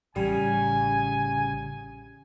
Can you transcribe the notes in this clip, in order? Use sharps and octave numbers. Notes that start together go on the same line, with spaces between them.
A1 C#3 G3 G#5